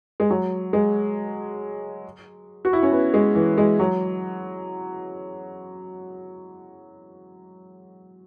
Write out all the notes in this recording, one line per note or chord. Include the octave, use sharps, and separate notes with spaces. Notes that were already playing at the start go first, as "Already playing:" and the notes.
G#3
F#3
G#3
F#4
E4
C#4
B3
G#3
E3
G#3
F#3